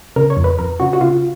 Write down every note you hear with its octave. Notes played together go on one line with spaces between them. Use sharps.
C#3 A#4
C#5
F2
B4
F2 A#4
C#3 F#4
F#4
C#3 F4